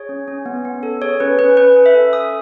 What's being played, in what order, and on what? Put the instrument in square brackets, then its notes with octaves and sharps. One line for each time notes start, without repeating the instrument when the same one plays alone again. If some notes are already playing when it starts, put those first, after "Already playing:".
Already playing: [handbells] G#4 C#5
C#4
C#4
B3
B3
A4
G#4 C#5
C#4 B4
C#4 B4
C#4 B4
C#4
E5
A4
C#4 D#6